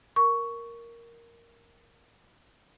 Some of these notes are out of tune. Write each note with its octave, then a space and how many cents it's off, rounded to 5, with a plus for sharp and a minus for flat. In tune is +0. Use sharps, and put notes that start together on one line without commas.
A#4 +0 C#6 +10